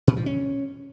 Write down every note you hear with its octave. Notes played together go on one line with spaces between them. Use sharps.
A#2
F3
C#4